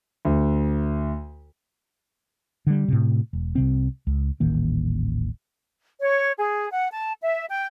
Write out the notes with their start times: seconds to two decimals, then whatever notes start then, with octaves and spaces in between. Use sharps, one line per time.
0.25 D2
2.67 D3 G3
2.88 A2 C3
3.33 E1
3.55 C2 C3 C4
4.07 C#2
4.40 D#1 A1 D#3 A#3
5.99 C#5
6.38 G#4
6.70 F#5
6.91 A5
7.21 E5
7.50 G5